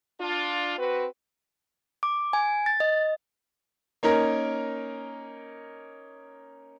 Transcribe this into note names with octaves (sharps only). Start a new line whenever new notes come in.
D4 F4
C4 F#4 B4
D6
G#5
A6
D#5
A#3 C#4 D#4 A#4